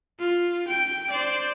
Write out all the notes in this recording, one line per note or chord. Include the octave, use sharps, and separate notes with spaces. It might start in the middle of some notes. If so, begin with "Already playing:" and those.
F4
G5 D7
C5 D5